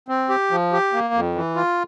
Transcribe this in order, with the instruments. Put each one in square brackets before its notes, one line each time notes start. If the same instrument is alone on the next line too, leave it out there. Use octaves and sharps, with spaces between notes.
[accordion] C4
G4
F3
G4
A#3
F2
E3
F4